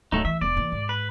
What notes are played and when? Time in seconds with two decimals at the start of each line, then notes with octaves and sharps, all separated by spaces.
0.12 D1 F#3 A3 D#4
0.25 E3 E5
0.41 E1 B3 D5
0.56 E3 A#3
0.72 G#2
0.89 B4